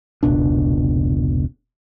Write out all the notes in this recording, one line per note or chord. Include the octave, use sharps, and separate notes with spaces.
F1 C#2 B2 D4